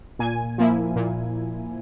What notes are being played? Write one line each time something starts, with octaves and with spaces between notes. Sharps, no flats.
A#2 G#5
F3 A#3 E4
A#2